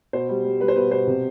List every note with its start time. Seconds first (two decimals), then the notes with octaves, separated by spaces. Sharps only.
0.13 B2 C5
0.29 G3
0.44 G3
0.60 G3 B4
0.68 C5
0.76 B2 B4
0.91 B2 C5
1.07 C3